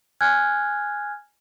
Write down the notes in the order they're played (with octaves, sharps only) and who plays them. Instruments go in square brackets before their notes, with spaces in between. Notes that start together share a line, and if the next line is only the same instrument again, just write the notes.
[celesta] G#5 F6 F#6 G#6